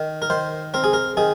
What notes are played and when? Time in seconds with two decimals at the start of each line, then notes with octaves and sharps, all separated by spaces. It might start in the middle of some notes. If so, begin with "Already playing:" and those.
Already playing: D#3
0.22 A#4
0.30 D#3 C5
0.74 C4 A#4
0.84 G#4
0.93 A#4
1.17 D#3 G#4